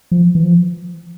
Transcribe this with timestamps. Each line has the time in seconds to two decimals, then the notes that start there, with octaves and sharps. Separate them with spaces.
0.11 F3
0.35 E3
0.43 F3